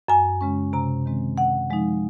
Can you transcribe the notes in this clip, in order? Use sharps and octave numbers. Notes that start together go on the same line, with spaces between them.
F#2 G#5
C#3 G#3 C#4
C3 A#5
D#3 G#3 C4
C3 F#5
F3 G#3 D#4